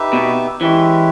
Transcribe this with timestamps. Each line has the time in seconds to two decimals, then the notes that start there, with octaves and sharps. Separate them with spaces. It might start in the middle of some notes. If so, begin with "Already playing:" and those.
Already playing: D#4 G4 B4 E5
0.13 B2
0.61 E3 G#3 C#4 E4 G4 B4